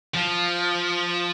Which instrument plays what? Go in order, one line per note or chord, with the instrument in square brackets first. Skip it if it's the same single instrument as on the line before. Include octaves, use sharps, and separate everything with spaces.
[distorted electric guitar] F3